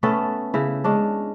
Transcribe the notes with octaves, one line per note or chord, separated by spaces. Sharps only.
A3 B3 C#4 A4
C#3 E4
G#3 C#4 D4